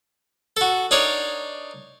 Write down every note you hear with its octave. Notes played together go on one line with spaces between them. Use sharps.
F#4 A4
D4 D#4 A#4 C#5 D5